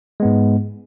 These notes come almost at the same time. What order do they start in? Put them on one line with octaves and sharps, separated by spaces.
G#3 B3 G#2